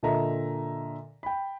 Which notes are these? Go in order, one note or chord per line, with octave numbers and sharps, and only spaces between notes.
A#2 D3 A4 D#5 E5 A#5
G5 B5